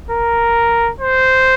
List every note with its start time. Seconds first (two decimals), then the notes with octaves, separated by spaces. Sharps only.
0.11 A#4
1.00 C5